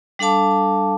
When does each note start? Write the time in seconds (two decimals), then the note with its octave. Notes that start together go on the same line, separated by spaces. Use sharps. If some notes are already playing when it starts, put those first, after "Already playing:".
0.19 G3 D4 A4 F5 A5 D6